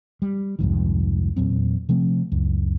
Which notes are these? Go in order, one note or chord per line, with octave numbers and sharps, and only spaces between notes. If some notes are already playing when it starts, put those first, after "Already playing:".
G3
C2 F2 G#2 D#3
E2 A#2 F#3 C4
C3 F3 A3 C4
C#2 F#2